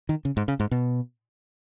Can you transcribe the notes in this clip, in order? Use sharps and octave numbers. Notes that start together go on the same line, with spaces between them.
D#3
C#3
G#2
C#3
G#2
B2